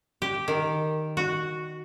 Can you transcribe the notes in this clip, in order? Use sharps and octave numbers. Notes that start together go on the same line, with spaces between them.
G4
D#3
F#4